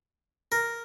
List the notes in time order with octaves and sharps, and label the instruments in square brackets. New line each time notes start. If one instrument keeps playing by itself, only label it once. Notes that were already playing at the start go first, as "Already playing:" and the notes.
[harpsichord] A#4